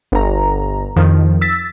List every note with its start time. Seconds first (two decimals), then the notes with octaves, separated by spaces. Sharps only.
0.12 G1 A#5
0.96 F2 D#3 F3
1.41 E6 A6 B6